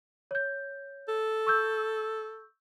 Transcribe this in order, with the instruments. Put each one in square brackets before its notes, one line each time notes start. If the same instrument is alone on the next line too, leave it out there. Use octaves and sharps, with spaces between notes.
[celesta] C#5 G6
[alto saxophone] A4
[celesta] C#6 E6 G6